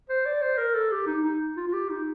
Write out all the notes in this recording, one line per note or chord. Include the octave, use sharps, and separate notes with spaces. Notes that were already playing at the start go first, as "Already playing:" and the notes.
C5
D5
C5
A#4
A4
G4
D#4
D#4
F4
F4
G4
D#4